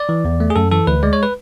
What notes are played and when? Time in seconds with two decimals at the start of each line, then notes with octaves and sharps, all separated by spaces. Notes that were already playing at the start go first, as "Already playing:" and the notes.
Already playing: D5
0.09 E3
0.25 E2
0.40 A3
0.50 G#4
0.56 F#2 A4
0.72 E3 A4
0.87 D2 B4
1.03 G#3 D5
1.13 C#5
1.23 B4